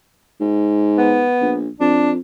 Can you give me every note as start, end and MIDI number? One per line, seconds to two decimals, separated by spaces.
0.40 1.26 44
0.98 1.58 59
1.41 1.68 34
1.80 2.18 41
1.80 2.11 62